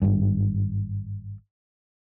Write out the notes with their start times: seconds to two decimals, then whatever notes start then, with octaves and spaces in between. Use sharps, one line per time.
0.02 G#1 G2